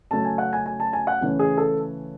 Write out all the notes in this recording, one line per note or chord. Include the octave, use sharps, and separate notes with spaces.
C#3 F#3 A3 C#4 A5
G#5
F#5
G#5
G#5
A5
G#5
F#5
C#3 E3 A3 C#4
G#4
A4